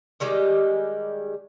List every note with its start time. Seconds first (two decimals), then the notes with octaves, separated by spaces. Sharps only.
0.20 D#3 G3 G#3 G4